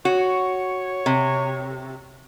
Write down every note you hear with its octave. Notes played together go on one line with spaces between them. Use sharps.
F#4 C#5
C3